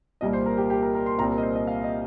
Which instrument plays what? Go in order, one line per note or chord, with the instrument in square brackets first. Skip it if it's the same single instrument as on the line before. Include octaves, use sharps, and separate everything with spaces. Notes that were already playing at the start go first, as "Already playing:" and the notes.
[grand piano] C2 A#2 G3 A#3 D#5
C5
A#4
G4
G4
A#4
A#4
C6
C2 A#2 G3 C4 A#5
A#4
D#5
C5
D#5
F5
D#5